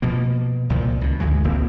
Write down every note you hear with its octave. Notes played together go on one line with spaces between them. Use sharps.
B2 F3 A#3
C2 A#2 D#3 F3
C#2 B2
G#1 D2 E3 G#3
D#1 C#2 A#3 C4